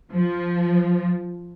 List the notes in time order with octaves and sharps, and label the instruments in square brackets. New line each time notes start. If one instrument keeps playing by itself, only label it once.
[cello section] F3